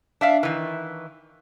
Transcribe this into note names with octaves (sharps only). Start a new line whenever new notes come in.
D4 E5 F5
D#3 E3